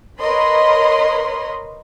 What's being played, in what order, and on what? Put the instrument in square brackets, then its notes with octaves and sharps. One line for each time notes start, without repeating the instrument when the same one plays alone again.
[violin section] A#4 B4 C#5 D#5 B5 C6